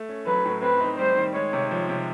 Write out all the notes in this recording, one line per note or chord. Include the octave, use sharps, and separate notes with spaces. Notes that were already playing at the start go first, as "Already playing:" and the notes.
Already playing: A3
C#4
F#3 B4
A2
C4 B4
D#4
G3 C5
D#3
G#3 C#5
C3
F3
C3